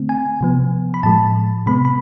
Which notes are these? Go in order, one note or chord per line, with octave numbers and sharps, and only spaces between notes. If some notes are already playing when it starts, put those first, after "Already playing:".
Already playing: D3 A3 C4
G#5
C3 F3 B3
B5
A2 F3 G#3 A5
C3 G#3 B3 B5
B5